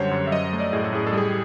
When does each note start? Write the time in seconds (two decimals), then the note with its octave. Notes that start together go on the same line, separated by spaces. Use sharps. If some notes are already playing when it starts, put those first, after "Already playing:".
Already playing: F#2 D3 G3 C5 C#5 F#5
0.11 F#2
0.27 E5
0.32 F#3 D#5
0.53 A3
0.60 D5
0.73 A2 G#4
0.84 A4
0.93 A2 G#4
1.07 A4
1.13 G3 G#4